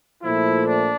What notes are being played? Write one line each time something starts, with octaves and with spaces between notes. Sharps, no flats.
A#2 F3 A3 E4
D4